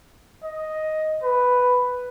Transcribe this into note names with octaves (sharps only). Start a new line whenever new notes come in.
D#5
B4